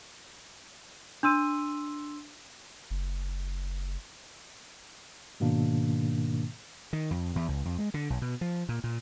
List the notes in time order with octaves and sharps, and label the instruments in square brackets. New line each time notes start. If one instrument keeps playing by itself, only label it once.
[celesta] D4 C6 E6 D#7
[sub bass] F#1
[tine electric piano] G#2 B2 D#3 A#3 D4
[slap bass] D#3
F2
E2
C#2
F2
G#3
D3
B1
B2
F3
A#2
A#2